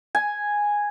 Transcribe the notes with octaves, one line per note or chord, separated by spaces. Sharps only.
G#5